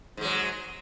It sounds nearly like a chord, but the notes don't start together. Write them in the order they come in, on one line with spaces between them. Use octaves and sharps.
G#2 G#3 F#3